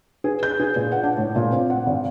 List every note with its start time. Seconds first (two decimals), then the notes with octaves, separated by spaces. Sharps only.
0.24 G#4
0.43 G6
0.60 G#4
0.76 A#2
0.92 F#5
1.03 D4
1.17 A2
1.36 A#2
1.51 C4
1.70 F#5
1.86 G#1